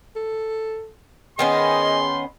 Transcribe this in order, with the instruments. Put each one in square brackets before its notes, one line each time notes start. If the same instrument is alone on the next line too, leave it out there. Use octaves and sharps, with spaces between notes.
[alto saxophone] A4
[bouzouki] D#3 B3 C#4 [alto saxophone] G#4 [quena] D#5 [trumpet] C6